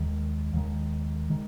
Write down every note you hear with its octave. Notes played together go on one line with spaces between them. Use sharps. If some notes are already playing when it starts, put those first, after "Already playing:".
Already playing: D#2 D#3 G#3
D#2 D#3 G#3
D#3 G#3